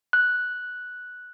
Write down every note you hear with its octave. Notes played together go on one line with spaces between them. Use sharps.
F#6